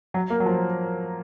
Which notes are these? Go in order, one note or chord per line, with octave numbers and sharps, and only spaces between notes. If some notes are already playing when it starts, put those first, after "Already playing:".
F#3
A#3
F#3
F3